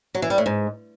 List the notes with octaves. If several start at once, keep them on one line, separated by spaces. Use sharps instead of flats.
F#3
E3
G3
A2
G#2